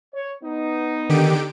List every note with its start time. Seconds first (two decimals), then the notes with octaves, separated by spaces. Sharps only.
0.14 C#5
0.44 B3 D#4
1.09 D3 D#3 G4 D7